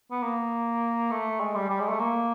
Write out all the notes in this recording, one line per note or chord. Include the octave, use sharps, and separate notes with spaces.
B3
A#3
A3
G#3
G3
G3
G#3
A3
A#3